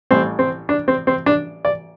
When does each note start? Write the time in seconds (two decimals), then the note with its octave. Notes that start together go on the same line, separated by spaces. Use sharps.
0.11 A1 A2 G3 C4
0.39 C4
0.69 D4
0.88 C4
1.07 C4
1.26 D4
1.65 D5